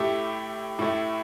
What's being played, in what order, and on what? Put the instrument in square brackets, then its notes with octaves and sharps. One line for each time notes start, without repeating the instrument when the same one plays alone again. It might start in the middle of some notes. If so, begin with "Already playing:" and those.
Already playing: [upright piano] A2 A3 G4
A2 A3